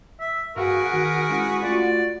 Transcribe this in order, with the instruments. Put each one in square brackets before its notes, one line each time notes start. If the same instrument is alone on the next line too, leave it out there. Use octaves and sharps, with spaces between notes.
[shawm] E5
[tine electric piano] G2 F5 [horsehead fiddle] F#4 [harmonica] G#4 B4 C#6 [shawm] A#4
[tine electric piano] D#3
[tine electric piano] G#3 C#4 E4 [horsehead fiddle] F#4
[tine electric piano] A3 F4 [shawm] D5